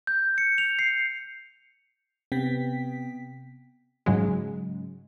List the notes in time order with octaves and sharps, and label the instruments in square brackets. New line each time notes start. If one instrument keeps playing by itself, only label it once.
[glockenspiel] G6
C#7
F7
C7
[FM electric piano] C3 B3 G5 B6
[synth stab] G#2 C#3 F#3 G#3